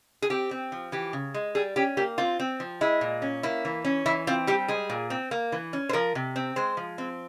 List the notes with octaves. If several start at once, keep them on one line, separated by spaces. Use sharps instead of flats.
G#4
C4 G4
C4
F3
E3 G4
C#3
G#3
G3 G#4
C#4 G4
A#3 G4
C4 F4
C4
F3
G#3 E4
A#2
C#4
A#3 E4
E3
C#4
E3 E4
C4 F4
G3 G4
G#3 G#4
A#2
C4
A#3
E3
C#4
C5
F3 A#4
C3
C4
G#3 C5
F3
C4